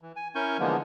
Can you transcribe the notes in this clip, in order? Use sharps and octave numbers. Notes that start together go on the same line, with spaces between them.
E3
G#5
C#4 E4 A#4 G#5 C#6 G6
D3 E3 F3 G#3 A#3 B3